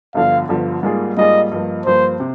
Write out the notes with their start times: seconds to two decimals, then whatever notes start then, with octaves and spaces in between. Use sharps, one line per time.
0.15 G1 G2 D3 F3 F5
0.49 G1 G2 D3 F3
0.83 G#2 G3 A#3 F4 G#4
1.17 G#2 G3 A#3 F4 G#4 D#5
1.52 G2 F3 A#3
1.86 G2 F3 A#3 C5
2.20 C3